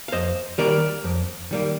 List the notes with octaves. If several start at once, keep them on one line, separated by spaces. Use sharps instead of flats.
F5
F2 C5 D#5
D#3 G3 A#3 A#4 D5
F2
D#3 G3 A#3